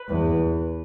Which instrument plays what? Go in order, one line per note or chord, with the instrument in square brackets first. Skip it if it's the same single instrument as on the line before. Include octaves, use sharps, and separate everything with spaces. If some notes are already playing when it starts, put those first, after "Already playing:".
Already playing: [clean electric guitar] B4
[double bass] E2